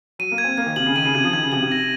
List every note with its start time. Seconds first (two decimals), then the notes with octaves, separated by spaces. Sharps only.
0.19 F#3 D#7
0.32 A#3
0.38 G#6
0.44 C4
0.58 A#3 G#6
0.66 D#3
0.76 C3 F#7
0.86 C#3
0.96 D#3 D#7
1.05 C#3
1.15 C3 G#6
1.24 F3
1.33 D#3 G#6
1.43 C#3
1.52 C3 F#7
1.62 C3
1.72 A#6